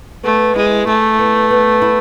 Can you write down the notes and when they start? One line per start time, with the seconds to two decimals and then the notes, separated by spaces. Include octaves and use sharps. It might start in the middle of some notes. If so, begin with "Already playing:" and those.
0.23 A3 B3
0.56 G#3 E4
0.87 A3 G#4
1.19 B3
1.51 B3
1.82 E4